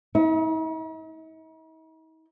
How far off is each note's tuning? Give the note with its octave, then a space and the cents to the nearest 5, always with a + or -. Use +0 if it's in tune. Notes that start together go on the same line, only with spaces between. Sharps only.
D#4 +45